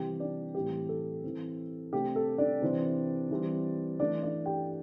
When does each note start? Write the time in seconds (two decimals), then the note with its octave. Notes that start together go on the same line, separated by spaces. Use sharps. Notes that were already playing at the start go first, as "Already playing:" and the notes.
Already playing: C3 E3 G3 G4 G5
0.20 D4 D5
0.54 A2 E3 G3 C4 G4
0.89 A4
1.24 E3 C4
1.93 C3 A3 D4 G4
2.16 A4
2.38 D4 D5
2.62 C3 E3 C4
3.31 E3 G3 C4
3.99 E3 A3 D4 D5
4.23 D4 D5
4.46 G4 G5